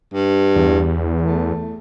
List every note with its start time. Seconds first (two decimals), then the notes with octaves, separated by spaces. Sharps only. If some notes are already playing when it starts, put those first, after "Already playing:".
0.14 G2
0.56 E2
1.22 A3